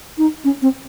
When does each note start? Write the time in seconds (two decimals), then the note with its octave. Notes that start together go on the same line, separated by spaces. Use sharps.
0.18 D#4
0.44 C#4
0.62 C4